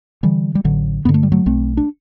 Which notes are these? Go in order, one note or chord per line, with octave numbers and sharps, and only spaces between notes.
D3 E3 G3
G3
A1 D3 F#3
G2 D3 B3
A3
G3
F#3 A3
B1 A3 C4
D4